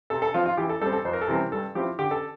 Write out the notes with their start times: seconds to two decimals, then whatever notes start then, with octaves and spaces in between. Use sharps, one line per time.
0.10 C3 A4
0.22 A4
0.34 F3 C4 F4
0.46 F4
0.57 E3 G4
0.69 A4
0.81 G3 A4
0.86 C4
0.93 A4
1.05 F2 C5
1.13 A#4
1.21 A4
1.28 C3 E3 G3 C4 A#4
1.52 G2 A4
1.75 F3 C4 E4 G4
1.99 D3 G4
2.11 A4